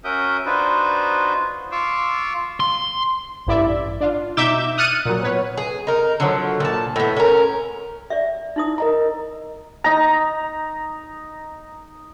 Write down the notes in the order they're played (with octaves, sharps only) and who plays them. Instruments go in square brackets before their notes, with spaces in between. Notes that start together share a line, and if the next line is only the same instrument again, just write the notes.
[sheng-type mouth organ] C#4 F#4 A#4 E5 D#6 G6
D4 D#4 F4 F#4 B4 C5
F4 F5 C#6 D6 E6
[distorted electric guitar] C6
[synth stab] A1 G2 E4 D5 E5
D4 F4
B2 D#4 E5 D6 G6 E7
D#6 F6 F#6 A6 C#7 D#7
A#2 F#3
B3 B4 C#5
[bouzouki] G#4
D#4 A#4
D3 F3 F#3
A#2 A5
A2 B3
C#4 A#4
[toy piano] D5 E5
D#4 E4 D#6
[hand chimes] A#4 D#5 A#5
[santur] D#4 A#5